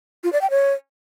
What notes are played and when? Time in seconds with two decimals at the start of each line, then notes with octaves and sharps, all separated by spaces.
0.24 F4
0.33 D5
0.41 G5
0.50 C#5